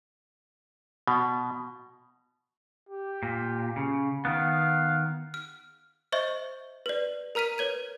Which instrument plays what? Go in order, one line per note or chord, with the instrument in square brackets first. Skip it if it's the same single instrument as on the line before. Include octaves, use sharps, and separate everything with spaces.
[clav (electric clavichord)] B2
[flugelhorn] G4
[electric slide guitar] A#2
C#3
[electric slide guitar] D#3 B3 [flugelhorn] F5
[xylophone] F6
C5 D#5 E5 C#6 G6
B4 D5
A#4 A#5 F6 B6 D#7
B4 C#5 G#6 D#7